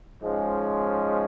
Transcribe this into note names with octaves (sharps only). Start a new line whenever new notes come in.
G#2 F3 G#3 C#4